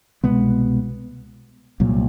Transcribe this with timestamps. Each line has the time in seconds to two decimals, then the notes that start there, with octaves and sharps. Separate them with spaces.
0.24 C2 B2 G#3 B3
1.80 C2 A#2 F#3 A#3